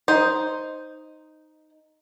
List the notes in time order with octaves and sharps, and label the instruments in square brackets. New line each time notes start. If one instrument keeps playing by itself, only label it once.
[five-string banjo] D#4 C5